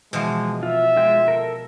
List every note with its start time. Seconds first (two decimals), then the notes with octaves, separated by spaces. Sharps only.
0.13 B2 E3 F3 G#3
0.63 F4 E5
0.97 G#3 F4 G5
1.28 A4 A#4